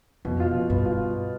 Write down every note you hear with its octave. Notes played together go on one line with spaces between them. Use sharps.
F2 B2
F4
B2
G2 B3
F4